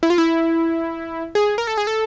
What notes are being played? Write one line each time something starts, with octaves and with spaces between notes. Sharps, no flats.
E4
F4
E4
G#4
A#4
A4
G#4
A4